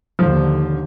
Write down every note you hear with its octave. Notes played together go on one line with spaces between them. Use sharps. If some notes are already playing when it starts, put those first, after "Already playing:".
D#2 D3 F3